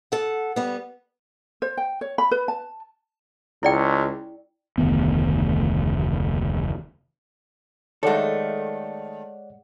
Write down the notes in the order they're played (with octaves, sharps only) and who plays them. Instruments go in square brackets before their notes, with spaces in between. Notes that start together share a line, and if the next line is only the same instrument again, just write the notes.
[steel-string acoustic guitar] A4 F#5
G3 B3
[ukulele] C5
G5
C#5
B5
B4
A5
[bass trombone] C#2 [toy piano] E4 D5 G5
[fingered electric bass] F1 D2 D#3 B3
[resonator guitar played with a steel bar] D#3 A3 [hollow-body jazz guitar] G#3 A4 [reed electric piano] C#5 D5 F#5